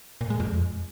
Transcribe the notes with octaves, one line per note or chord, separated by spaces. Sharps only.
A#2
G#3
F2